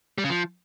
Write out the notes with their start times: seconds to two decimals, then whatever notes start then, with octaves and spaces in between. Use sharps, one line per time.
0.18 G3
0.24 C#3
0.30 F3